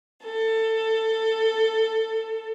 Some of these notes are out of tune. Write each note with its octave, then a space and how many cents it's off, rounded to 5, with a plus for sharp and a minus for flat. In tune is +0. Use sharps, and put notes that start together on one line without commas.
A4 +20